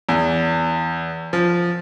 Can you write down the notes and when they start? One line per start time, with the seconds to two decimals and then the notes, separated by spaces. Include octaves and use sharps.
0.09 E2
1.33 F3